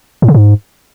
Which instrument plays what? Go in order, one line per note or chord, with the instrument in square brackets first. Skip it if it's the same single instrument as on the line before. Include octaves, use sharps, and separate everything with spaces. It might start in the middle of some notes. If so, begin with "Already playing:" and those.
[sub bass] A2
C#3
G#2